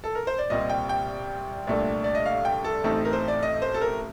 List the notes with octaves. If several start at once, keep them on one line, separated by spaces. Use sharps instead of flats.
A4
A#4
C5
D5
C2 A#2 G3 C4 D#5
G5
G5
C2 A#2 A3 D4
D5
D#5
F5
G5
A4
A1 A2 A3 C4 D#4 A4
A#4
C5
D5
D#5
C5
A4
A#4